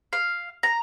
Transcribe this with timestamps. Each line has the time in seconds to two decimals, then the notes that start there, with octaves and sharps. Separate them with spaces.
0.13 F5
0.63 A#5